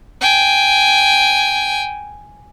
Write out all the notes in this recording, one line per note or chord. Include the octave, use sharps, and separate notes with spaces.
G5 G#5